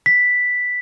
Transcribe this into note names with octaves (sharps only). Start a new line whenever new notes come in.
B6